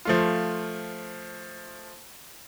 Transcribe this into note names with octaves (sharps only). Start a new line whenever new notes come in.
F3 A3 F4